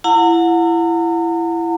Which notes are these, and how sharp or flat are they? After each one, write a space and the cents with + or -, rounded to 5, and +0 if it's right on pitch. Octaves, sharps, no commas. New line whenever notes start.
E4 +25 F#5 -30 A#5 -40